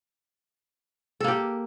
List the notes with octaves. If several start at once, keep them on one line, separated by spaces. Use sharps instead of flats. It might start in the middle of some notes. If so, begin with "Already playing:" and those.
A#3 G4 A4